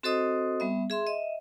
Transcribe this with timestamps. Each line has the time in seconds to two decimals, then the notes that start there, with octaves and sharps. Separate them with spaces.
0.03 C4 F#4 A4 C5 D#5 D#6
0.60 G3 B3 E5
0.90 G#4 E5 C6
1.07 D#5 E5